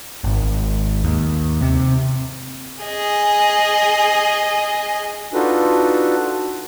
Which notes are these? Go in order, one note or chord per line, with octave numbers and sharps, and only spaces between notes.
G#1
D#2
C3
G#4 D#5
D4 D#4 F4 F#4 A4 B4